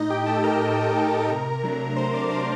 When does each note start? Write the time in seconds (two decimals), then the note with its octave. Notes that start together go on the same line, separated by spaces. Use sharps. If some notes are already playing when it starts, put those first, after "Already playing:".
Already playing: A2 D#4 D#5
0.10 G4 G5
0.26 A3 D#4 A4 A5
0.44 A#4 A#5
0.61 A2
0.95 A3 D#4
1.28 C3
1.63 F#3 A3 D4
1.96 C3 C5 C6
2.14 D5 D6
2.31 F#3 A3 D4 C5 C6